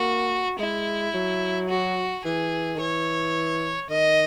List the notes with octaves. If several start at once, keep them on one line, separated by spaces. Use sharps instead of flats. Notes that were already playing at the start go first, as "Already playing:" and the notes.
Already playing: A#3 F#4
G#3 E4
F#3
F#4
E3 G#4
D#3
E3 C#5
D#3 D#5